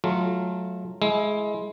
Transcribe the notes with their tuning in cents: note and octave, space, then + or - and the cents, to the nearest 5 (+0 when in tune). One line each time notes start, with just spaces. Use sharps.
F#3 -10 A3 -30 F4 -10
G#3 +20 E4 +0